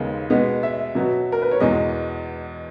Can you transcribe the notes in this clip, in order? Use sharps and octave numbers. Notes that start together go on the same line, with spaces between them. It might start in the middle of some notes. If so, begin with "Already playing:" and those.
Already playing: D#2 C#3 G#3 B3
B2 G#3 B3
E5
B2 F#3 B3
A#4
B4
C#5
E2 B2 G#3 D#5